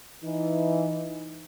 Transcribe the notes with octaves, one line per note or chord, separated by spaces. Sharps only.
E3 D#4